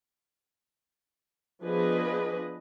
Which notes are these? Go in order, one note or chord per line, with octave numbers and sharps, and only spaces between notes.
F3 B3 D4 G#4 B4 D#5